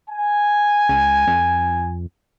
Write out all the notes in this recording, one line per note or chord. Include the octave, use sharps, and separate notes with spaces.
G#5
C#2
F2